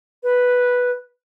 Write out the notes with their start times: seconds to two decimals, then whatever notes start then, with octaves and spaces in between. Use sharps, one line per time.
0.23 B4